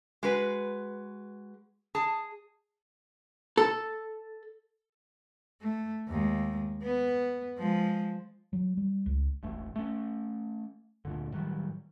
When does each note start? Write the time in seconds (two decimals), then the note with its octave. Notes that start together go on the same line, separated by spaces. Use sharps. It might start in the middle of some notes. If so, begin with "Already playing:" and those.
0.23 G#3 F#4 B4
1.95 G#4 A5
3.57 A4
5.61 A3
6.08 D#2 G#3
6.83 B3
7.58 F3 G#3
8.53 F#3
8.77 G3
9.06 C#2
9.43 E1 A1 A3
9.76 A3 C#4
11.05 D2 A#2 D3
11.32 A2 D#3 F#3 G3